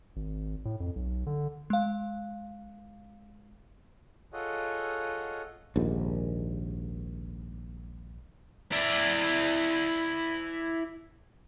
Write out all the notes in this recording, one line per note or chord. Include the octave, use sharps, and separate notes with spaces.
G#1
A2
F2
B1
D3
G#3 F5
F4 G#4 A4 C#5 D#5 F#5
A#1 D#2 G#2
E4 D5